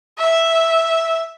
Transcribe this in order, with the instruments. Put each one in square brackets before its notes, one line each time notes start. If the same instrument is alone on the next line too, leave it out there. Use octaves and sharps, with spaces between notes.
[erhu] E5